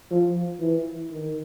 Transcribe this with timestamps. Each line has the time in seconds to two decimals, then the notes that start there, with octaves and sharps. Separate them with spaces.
0.11 F3
0.60 E3
1.12 D#3